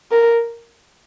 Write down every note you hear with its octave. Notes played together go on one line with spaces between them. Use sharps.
A#4